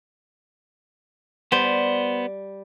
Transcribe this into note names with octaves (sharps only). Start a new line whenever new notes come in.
G3 B3 C5